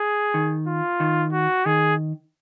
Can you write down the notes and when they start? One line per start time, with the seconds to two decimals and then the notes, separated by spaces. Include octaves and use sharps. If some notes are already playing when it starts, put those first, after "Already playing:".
Already playing: G#4
0.34 D#3
0.68 F4
1.00 D#3
1.32 F#4
1.66 D#3 G#4